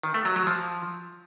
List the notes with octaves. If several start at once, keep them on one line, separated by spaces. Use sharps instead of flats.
D#3
A3
F#3
F#3
F3